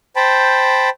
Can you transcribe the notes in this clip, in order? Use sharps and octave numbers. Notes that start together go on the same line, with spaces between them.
C5 G5 A5 B5